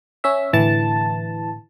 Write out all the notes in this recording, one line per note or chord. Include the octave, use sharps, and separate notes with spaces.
C#4 E5
A2 D3 E3 A5